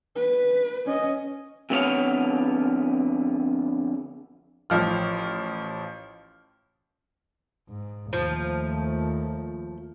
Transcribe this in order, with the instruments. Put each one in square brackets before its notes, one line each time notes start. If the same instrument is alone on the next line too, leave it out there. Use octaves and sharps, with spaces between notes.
[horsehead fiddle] B4
C#4 D#5
[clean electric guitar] F2 D3 B3 E4 C#5 F5
[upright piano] A1 F3 F6
[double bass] G#2
[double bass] D#2 A3 [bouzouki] F3